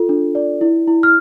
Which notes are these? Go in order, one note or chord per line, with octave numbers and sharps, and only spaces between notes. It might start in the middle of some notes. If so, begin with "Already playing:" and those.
Already playing: F4 A4
D4
D5
E4
E4
F6